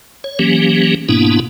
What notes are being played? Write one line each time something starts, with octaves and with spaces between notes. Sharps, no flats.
C#5
E3 F#3 A#3 C#4 G4
G#2 B2 A#3 B3 D4 E4